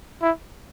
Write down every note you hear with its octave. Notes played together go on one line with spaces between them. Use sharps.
E4